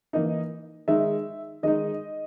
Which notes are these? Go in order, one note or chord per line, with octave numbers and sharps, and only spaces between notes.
E3 A#3 D#4 D#5
D#3 G#3 D#4 E5
D#3 G#3 D#4 D#5